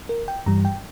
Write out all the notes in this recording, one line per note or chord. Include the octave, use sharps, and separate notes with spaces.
A#4
G5
G2 E3 G3 A#5
G5